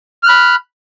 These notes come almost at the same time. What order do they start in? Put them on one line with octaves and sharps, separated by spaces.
F6 F#6 B5